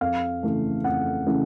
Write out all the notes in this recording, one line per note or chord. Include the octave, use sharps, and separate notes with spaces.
F2 F5
C#3 E3 A3
F2 F#5
C#3 E3 A3